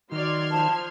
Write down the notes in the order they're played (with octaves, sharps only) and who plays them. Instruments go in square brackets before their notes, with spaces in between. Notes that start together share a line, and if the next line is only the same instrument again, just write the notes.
[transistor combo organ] D#3 [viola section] F#3 D5 [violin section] C6 F6 G#6
[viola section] F3 [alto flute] A5